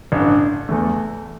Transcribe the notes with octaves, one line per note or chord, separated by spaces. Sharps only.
A1 G2 D3
E2 E3 A3